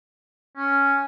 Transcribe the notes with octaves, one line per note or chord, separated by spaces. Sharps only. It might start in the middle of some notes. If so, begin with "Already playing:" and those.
C#4